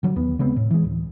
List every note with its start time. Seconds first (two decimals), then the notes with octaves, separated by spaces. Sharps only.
0.03 D3 F#3 G3
0.16 D#2 B3
0.39 C#3 G#3 B3 C4
0.56 A2
0.71 E3 G#3
0.84 D1